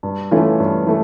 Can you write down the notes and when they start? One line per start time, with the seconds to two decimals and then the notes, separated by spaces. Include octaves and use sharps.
0.03 G2
0.31 E3 A3 C#4 F4
0.60 G2
0.87 E3 A3